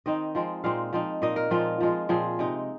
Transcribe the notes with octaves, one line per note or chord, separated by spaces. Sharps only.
D#3 C4 D#4 D#5
F3 G#3 C4
A#2 G#3 C4 D#4 F5
F3 C4 D#4
A#2 A#3 D#4 D#5
A#4
A#2 F3 G#3 C4 F4
F3 G#3 F4
A#2 F3 C4 G#4
C3 G#3 D#4